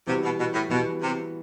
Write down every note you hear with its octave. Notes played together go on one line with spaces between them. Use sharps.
C3 E3 G3 B3 F#4
B2
B2
A2
B2 E3 G3 B3 F#4
C3